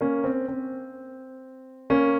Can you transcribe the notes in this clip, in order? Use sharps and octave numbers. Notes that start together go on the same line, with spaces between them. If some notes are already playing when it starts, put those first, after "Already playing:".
A#3 C#4
C4
C4
A#3 C#4